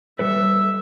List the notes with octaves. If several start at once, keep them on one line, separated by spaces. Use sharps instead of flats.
G3 A4 B4 E5